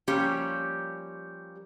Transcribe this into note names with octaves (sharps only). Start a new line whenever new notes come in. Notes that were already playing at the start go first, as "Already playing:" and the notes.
F3 G3 A#3 C#4 G4 C#5